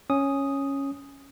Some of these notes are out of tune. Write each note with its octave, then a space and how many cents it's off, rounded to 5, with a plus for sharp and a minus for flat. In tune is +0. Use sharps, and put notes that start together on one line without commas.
C#4 -5 D#6 +0